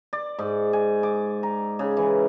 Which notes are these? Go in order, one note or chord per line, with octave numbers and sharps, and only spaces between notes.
D5
G#2
G#5
D6
A#5
C#3
E3